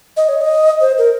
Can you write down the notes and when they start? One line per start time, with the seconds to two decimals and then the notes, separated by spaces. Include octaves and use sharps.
0.17 D#5
0.28 C#5
0.41 D#5
0.81 C5
0.98 A#4